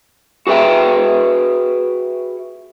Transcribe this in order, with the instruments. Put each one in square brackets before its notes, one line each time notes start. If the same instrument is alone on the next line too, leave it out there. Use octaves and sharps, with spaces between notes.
[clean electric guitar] F#4 G#4 B4 E5 G5